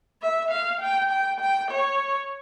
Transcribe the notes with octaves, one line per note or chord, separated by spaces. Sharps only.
E5
F5
G5
G5
G5
C#5